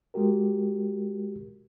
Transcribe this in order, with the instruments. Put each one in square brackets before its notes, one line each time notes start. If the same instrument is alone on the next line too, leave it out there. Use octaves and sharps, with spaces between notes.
[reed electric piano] G#3 F#4 G4 A#4